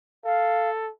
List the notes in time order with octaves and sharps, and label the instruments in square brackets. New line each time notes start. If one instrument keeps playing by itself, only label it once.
[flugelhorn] A4 [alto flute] F5